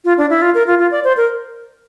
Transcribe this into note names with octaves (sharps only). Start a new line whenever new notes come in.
F4
D4
E4
F4
A#4
F4
F4
D5
C5
A#4